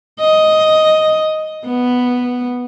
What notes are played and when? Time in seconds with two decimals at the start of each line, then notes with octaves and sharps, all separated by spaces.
0.20 D#5
1.66 B3